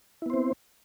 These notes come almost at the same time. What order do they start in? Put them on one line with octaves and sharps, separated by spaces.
E4 B3 C5 C4